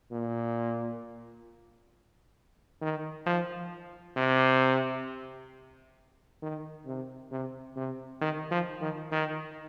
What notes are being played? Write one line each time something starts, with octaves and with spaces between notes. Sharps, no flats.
A#2
D#3
F3
C3
D#3
C3
C3
C3
D#3
F3
D#3
D#3